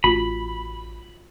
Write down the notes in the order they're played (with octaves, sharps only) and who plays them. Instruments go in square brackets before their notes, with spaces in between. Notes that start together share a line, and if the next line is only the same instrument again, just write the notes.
[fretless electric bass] A1 [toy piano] F4 F#4 [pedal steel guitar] B5